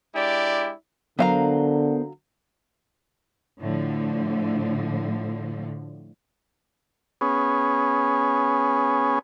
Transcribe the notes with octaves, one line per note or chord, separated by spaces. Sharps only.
G#3 D4 E4 G4 D5
D3 F#3 B3 A#4 C5 F5 A#5
A2 D3 F3
B3 C#4 G#4